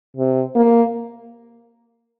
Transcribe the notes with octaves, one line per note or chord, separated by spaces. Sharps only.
C3
A#3